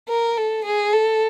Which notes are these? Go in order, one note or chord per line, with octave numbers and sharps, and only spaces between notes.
A#4
A4
G#4
A4